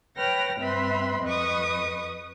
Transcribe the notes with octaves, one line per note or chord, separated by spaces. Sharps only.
B4 C#5 G5 F6 A#6
G2 C4 B4 E5 B5 C6
F2 B4 D#5 C#6 D#6